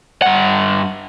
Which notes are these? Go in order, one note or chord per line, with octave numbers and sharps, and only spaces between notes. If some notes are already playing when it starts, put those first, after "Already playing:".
G2 F#5